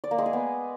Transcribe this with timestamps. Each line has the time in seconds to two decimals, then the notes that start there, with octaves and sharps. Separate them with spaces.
0.04 D5
0.11 A#3
0.18 G#3
0.26 G#4
0.33 B3